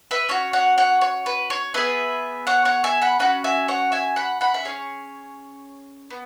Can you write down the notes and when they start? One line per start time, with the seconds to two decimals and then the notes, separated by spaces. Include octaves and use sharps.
0.11 B4 E5
0.29 C#4 F#4 C#5
0.53 C#5 F#5
0.78 C#5 F#5
1.01 C#5
1.26 B4
1.50 C#5
1.74 B3 G#4 B4 E5
2.47 C#5 F#5
2.65 C#5 F#5
2.84 E5 G#5
3.02 F#5 B5
3.19 C#4 F#4 F#5 B5
3.44 E5 G#5
3.68 C#5 F#5
3.92 E5 G#5
4.16 F#5 B5
4.41 F#5 B5
4.54 E5
4.65 C#4 G#4 C#5
6.10 B3